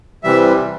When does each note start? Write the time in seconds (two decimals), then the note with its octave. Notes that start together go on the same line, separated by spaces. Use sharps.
0.24 C3 E3 G3 E5